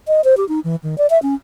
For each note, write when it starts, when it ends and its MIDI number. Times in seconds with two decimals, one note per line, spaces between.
0.08 0.21 75
0.24 0.37 72
0.37 0.47 67
0.49 0.60 63
0.64 0.76 52
0.83 0.98 51
0.98 1.07 74
1.10 1.20 76
1.22 1.35 61